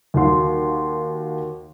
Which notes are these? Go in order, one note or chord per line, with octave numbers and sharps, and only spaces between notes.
D#2 F#4 C6